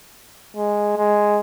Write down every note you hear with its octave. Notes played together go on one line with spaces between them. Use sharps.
G#3
G#3